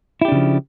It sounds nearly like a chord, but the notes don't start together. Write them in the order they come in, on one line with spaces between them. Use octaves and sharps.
E4 G4 D4 C#3 F3